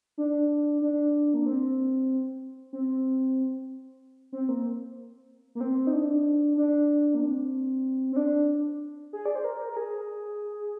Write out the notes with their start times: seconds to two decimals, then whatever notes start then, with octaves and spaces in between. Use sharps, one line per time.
0.18 D4
0.82 D4
1.34 A#3
1.46 C4
2.73 C4
4.32 C4
4.49 A#3
5.55 A#3
5.61 C4
5.87 D#4
5.93 D4
6.57 D4
7.15 A#3
7.21 C4
8.12 C4
8.16 D4
9.13 G#4
9.26 D5
9.35 C5
9.44 A#4
9.69 A#4
9.77 G#4